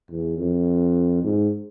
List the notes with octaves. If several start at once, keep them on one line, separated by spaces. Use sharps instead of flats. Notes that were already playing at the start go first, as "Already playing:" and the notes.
E2
F2
G#2